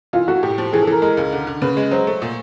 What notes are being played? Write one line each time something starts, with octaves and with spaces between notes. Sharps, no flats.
E3 F4
A3 F#4
A2 G4
F3
E3 G#4
A4
E3 A#4
G#3 A#4
C#2
D3
D3
C#3 B4
G#3
F#3 C5
A3
A#2